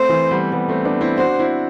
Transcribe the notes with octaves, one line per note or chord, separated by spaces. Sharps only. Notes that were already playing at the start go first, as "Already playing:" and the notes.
Already playing: A3 C4 C5
E3
G3 B3
G3 B3
A3 C4
B3 D4
C4 E4
D4 F#4 C5
C4 E4